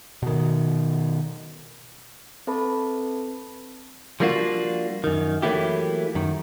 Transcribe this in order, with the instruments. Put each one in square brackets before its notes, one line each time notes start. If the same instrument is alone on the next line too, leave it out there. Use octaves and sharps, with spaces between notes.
[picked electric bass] B2 D#3
[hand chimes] C4 A4 B4 E5 A5 B5
[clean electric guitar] F3 G3 A#3 D4 F4 F#4
F#2 D#3
E3 F#3 A3 A#3 E4 G4
F#2 D#3